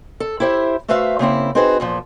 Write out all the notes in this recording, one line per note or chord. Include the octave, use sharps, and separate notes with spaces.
A4
E4 G4 C5 E5
A3 F#4 B4 C5 E5 F5
C#3 A#3 C4 E4
C4 D#4 F#4 G#4 B4 C5
E2 A#2 F3